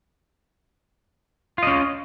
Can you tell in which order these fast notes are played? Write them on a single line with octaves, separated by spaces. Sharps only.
F4 D#5 C#4